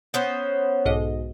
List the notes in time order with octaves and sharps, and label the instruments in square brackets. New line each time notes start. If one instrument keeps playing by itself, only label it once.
[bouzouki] B3 C#4 C5
[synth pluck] B1 G#2 D#5